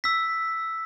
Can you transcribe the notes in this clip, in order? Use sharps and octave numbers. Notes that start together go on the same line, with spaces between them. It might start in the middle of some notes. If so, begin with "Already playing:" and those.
E6 B6